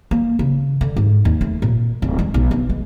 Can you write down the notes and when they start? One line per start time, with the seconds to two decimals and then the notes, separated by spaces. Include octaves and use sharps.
0.11 A#3
0.39 C#3
0.81 D3
0.96 G#2
1.25 D#2
1.41 A3
1.62 A#2
2.02 D1
2.19 G#3
2.34 B1
2.51 B3
2.69 G#3